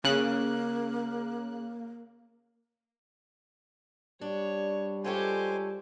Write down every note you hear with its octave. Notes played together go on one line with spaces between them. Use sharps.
C#3 A#3 F#6
G3 D4 C#5
G#3 F4 G4 A4 C5 C#5 G#5